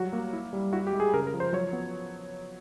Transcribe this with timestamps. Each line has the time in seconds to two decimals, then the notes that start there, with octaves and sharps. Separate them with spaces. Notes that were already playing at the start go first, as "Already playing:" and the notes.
Already playing: F#3 G3 F#4
0.13 A#3
0.33 E4
0.53 G3
0.72 E4 F#4
0.87 G4
0.93 G#3
1.00 G#4
1.14 C#3 A#4
1.27 A#4
1.34 F3
1.40 C5
1.53 F#3 C#5
1.73 B3